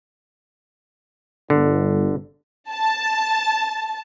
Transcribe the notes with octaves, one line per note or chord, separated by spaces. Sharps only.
G1 D3
A5